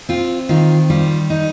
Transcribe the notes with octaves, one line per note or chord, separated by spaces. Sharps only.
C4 F4
D#3 F4
G3 F4
D#4